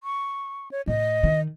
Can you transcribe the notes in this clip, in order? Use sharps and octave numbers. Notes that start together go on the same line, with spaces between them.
C#6
C#5
A2 D#5
D#3